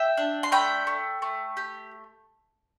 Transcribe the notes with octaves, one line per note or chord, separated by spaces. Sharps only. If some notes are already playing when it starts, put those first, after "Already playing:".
Already playing: E5 G5
D4
C6
A3 G5 B5
A3
A3
G4